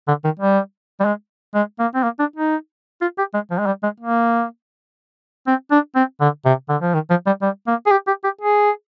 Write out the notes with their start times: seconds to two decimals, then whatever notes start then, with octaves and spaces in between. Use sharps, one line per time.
0.08 D3
0.24 D#3
0.39 G3
1.00 G3
1.05 G#3
1.55 G#3
1.79 A#3
1.95 C4
2.03 A#3
2.19 D4
2.36 D#4
3.01 F4
3.18 G4
3.34 G#3
3.51 F3
3.59 G#3
3.66 G3
3.83 G#3
4.00 A#3
5.47 C4
5.71 D4
5.95 C4
6.21 D3
6.45 C3
6.69 D3
6.81 F3
6.94 D#3
7.10 F3
7.26 G3
7.42 G3
7.67 A#3
7.86 G#4
7.91 G4
8.07 G4
8.24 G4
8.41 G#4